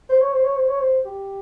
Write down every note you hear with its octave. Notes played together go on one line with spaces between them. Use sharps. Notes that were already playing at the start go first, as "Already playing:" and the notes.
C5
C#5
C5
C#5
C5
C#5
C5
G4